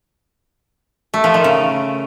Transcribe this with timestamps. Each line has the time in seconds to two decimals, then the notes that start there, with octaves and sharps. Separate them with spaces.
1.14 A3
1.24 F3
1.34 D#3
1.44 C#3